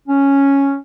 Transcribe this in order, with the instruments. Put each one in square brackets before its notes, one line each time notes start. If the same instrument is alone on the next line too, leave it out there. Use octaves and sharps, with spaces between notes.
[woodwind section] C#4